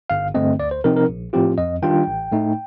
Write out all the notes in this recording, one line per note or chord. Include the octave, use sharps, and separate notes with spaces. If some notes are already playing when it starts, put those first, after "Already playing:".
G1 F5
G2 D3 A3 C4 D#5
D2 D5
C5
C3 F3 C4 D#4 A#4
A#4
A#1
A2 F3 C4 F4 G4
F2 D#5
D#3 G3 D4 F4 G5
A1
A2 A3 D#4